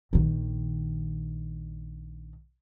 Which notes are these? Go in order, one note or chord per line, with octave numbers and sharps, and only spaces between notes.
A#1 D#3